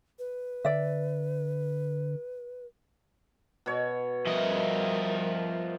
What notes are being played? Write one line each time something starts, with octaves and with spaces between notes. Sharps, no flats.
B4
D3 D5 E5
B2 C#5
F3 G3 A#4 D#5 E5